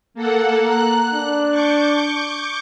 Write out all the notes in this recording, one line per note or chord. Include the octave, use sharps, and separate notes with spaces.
A#3 A4 F#5
A#5 F#6
D4
C#6 D6 G6